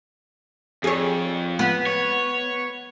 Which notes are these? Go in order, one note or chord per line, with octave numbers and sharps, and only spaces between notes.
F2 G#4 C#5
B3
C#5